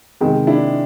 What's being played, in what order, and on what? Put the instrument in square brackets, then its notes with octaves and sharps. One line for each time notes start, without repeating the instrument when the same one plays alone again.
[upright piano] C3 D#3 G#3
[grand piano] D4 E4